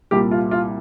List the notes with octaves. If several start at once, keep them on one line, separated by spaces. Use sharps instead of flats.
C2 A#2 G3 G4
F4
F4